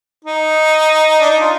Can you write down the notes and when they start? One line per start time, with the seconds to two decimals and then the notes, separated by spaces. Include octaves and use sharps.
0.25 D#4
1.20 D4
1.30 D#4
1.41 F4